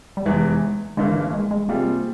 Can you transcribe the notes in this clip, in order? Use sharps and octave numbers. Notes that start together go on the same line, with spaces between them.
G3
F1 E2 E3 G#3
G1 G2 E3 G#3 A#3
G#3
G#3
C3 G3 A#3 C4 F4 G#4